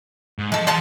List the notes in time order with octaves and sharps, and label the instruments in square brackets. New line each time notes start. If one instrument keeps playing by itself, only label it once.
[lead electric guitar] G#2
[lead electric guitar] F3 A5 [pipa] G#3 A4
[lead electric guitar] E3 C6 [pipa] G#4 F5 A5